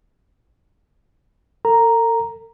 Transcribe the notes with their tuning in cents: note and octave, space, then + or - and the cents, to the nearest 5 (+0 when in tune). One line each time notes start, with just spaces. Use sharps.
A4 +45 A#5 +0